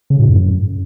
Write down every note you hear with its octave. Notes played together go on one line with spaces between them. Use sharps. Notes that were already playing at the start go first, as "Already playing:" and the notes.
C#3
A2
F#2